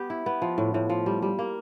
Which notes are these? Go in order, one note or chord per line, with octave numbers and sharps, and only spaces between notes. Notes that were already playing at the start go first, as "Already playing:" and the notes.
Already playing: B3 G4
E4
B3
F3
A2
A2
F3
G3
G3
A#3